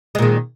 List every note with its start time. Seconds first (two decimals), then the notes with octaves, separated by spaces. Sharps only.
0.15 G#3
0.19 A#2
0.22 D#3